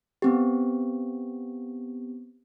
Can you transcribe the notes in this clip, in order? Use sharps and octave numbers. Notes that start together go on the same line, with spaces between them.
B3 C4 G4